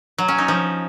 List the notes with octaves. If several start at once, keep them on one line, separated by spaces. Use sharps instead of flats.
F#3
C#4
D#4
F3